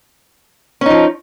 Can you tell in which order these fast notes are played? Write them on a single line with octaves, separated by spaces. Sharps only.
C#4 D#4 F3